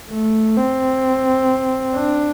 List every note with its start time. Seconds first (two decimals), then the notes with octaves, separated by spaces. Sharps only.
0.11 A3
0.57 C4
1.94 D4